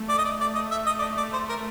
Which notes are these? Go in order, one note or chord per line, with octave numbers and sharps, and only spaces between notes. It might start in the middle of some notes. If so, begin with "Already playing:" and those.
Already playing: A3
D5
D#5
D5
D5
D#5
E5
D#5
D5
D#5
A3 D5
C5
A#4